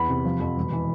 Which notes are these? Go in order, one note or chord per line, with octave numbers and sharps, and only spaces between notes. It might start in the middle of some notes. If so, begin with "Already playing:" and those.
Already playing: E2 B5
C3
F3
F2
E1
E3